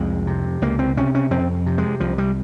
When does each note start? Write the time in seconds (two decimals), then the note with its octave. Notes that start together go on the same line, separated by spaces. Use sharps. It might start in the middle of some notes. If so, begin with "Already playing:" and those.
Already playing: C2 F2 G#3
0.27 C3
0.62 C#2 A#3
0.79 C4
0.97 C3 C#4
1.15 C#4
1.31 F2 C4
1.66 C3
1.78 G#3
2.00 C2 F3
2.18 G3